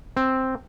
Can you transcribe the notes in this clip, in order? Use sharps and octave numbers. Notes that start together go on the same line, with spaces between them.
C4